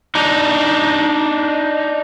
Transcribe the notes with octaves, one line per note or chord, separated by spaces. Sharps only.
D4 D#4